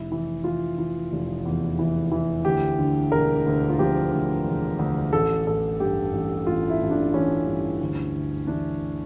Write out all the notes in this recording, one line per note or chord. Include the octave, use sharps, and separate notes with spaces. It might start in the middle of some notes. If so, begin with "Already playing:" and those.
Already playing: F1 E4
E3
E3 F4
E3
F1
E2
E3
E3
D2 G4
D3
E1 A#4
D2
F4
F3 G4
D2
E1
D2
A1 A4
A1 A4
G2 G4
A1
A1 F4
E4
A1
D4
E3 C#4
G2
D2
D2
E3 D4